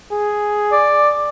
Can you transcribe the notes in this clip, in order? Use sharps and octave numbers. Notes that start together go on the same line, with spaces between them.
G#4
D5